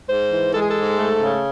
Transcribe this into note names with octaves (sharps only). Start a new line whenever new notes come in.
G#2 C5
E3
G#3 A4
G#4
A4
G#2
A3
C#3